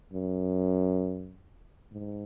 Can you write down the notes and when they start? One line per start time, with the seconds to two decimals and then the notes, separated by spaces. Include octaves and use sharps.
0.13 F#2
1.92 G#2